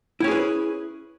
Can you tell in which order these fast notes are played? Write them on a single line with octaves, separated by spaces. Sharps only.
E4 C#4 G#4 B4